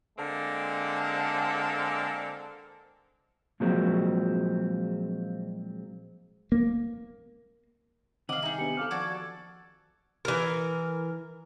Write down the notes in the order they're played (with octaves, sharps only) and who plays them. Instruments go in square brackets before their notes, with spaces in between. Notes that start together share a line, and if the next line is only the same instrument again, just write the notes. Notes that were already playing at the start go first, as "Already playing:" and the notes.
[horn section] D3 G#3 A#3 C4 A4
[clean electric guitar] A#2 F3 F#3 G#3 C4
[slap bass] A#3
[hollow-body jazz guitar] C2 D#3 [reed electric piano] C4 F#5 D6 [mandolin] D#5 F5 [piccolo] F#7
[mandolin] D#4 G#4 [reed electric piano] E5 A#5
[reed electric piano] B3 D4 G4 [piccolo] C#7
[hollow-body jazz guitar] C4 A4 [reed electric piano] F5 D6 F6
[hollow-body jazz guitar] D#2 F3 A5 [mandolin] F#4 A4 D5 [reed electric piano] D6 [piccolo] G#6
[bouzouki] E3 A#4